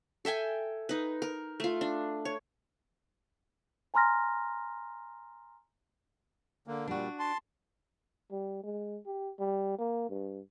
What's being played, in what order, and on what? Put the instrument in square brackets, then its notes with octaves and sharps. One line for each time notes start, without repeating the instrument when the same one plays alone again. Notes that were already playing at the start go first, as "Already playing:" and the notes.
[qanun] A4 E5 G5 G#5
D#4 B4
A#4
A3 F4
D4
C#5
[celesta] G#5 A#5 C6 F6 A#6
[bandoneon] D3 A#3
[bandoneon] A#2 G3 [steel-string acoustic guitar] D4 F#4
[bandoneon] A5 C6
[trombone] G3
G#3
G4
G3
A#3
G2